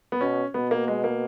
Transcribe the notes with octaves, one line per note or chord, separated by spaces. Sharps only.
B3
B2 C#4
B2 B3
A#3
G#3
A#3